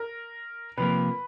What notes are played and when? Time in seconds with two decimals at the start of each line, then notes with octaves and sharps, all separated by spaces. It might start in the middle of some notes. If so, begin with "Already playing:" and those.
Already playing: A#4
0.77 C3 F3 A#3 B4